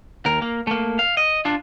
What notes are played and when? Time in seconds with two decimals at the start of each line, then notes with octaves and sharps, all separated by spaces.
0.26 D#2 A#4
0.42 A#3
0.67 A3 A#3
0.99 F5
1.17 D#5
1.45 D4 F4